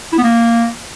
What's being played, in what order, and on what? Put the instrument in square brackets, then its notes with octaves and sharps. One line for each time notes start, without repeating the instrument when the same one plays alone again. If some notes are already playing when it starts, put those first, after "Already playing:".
[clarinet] E4
B3
A#3